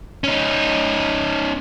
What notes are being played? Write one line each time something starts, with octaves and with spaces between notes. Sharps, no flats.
C#4 D#4